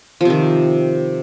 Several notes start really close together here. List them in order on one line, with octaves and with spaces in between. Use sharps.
F3 C3 D#3